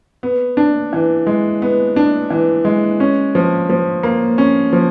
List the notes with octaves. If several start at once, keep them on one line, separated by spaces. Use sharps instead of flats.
B3
D4
E3
G#3
B3
D4
E3
G#3
C#4
F3
F3
A#3
C#4
F3